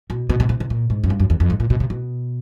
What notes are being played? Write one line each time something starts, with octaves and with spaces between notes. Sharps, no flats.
B2
B2
B2
C3
C3
A#2
G#2
F#2
G2
F#2
E2
F2
G#2
A#2
B2
C3
B2